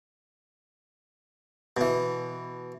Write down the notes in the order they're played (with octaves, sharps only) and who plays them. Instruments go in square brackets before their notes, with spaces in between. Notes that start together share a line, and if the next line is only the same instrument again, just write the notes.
[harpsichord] B2 E3